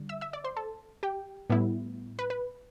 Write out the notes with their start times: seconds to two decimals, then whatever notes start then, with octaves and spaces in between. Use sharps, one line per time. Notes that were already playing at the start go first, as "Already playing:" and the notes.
Already playing: D3 G3
0.09 E5 E6
0.21 E5 E6
0.33 D5 D6
0.44 C5 C6
0.57 A4 A5
1.03 G4 G5
1.50 A2 G3 B3 E4
2.19 B4
2.30 B4